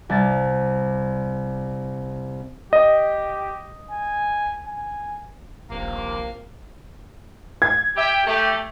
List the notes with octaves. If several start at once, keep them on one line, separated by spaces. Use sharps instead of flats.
C2 A6
G4 D#5
G#5
G#5
D#1 A#1 C3 F3 A#3
G#6
G4 E5 G5
A3 G4